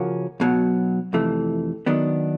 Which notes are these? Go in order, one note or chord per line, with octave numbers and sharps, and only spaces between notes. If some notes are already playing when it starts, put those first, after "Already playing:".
Already playing: C#3 F3 A#3 C#4 F#4
B1 B2 F#3
F2 C3 E3 A3
D#3 F#3 B3 D4